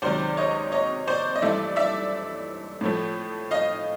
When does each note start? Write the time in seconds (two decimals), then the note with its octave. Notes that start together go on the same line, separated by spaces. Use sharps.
0.02 C#2 C3 D#3 F#3 C5 D5
0.37 C#5 D#5
0.72 C#5 D#5
1.08 C5 D5
1.36 D#5
1.42 G2 E3 A3 D5 E5
1.76 D5 E5
2.81 A2 F3 A3
3.51 D#5 F5